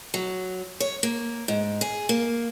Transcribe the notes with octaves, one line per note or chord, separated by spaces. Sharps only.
F#3
C#5
A#3
G#2
G#4
A#3